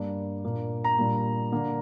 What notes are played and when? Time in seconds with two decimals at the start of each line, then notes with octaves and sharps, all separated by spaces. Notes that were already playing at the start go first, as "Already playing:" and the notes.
Already playing: G2 G3 A#3 D4
0.44 A#2 A#3 D4
0.84 A#5
0.97 A#2 G3 A#3 D4
1.52 D3 A#3 D4